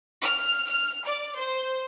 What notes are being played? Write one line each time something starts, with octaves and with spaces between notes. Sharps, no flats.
F6
F6
D5
C5